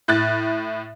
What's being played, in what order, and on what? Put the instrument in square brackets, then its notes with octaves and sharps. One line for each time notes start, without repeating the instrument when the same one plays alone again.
[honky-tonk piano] A2 F#6 A6